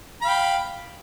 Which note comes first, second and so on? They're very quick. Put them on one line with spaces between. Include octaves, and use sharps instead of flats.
B5 F5 G5